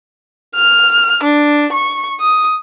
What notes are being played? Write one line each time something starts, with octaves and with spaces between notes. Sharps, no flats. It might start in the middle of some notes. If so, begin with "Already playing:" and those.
F6
D4
C#6
D#6